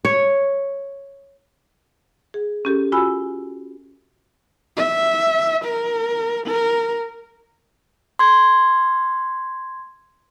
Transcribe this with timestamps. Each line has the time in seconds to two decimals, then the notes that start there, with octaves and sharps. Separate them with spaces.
0.05 C#5
2.34 G#4
2.65 C#4 G4 A4
2.92 F4 F#4 G#5 B5 E6
4.77 E5
5.65 A#4
6.47 A#4
8.19 C6 G#6